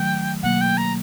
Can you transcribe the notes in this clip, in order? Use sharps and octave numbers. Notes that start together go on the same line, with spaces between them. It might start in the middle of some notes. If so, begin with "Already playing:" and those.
Already playing: D#3 F#3 A3 G5
B2 F#3 A#3 F#5
G5
A#5